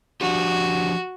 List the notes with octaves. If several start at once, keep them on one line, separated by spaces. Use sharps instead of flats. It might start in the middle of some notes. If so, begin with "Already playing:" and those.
F3 D4 F#4 G4